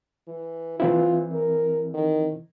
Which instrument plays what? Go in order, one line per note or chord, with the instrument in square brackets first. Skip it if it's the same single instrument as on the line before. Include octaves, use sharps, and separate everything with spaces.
[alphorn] E3
[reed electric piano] E3 C4 E4 [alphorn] F4
[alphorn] A#4
D#3